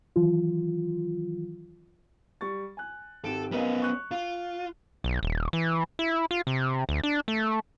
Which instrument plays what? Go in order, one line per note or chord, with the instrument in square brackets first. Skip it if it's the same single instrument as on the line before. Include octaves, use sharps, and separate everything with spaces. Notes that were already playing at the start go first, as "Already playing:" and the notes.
[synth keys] D#3 E3 F#3 F4
[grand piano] G3 C#6 A6
G#5 F#6
[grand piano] G#1 G4 D7 [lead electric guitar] A4
[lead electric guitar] B3 C#4 [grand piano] A#4 D#5 F5
[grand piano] C#6 F#6
[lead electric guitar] F4
[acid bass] B1
D#1
E3
E4
F4
C3
D2
D4
A3